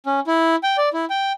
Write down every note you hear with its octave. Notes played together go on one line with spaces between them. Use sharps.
C#4
E4
G5
D5
E4
G5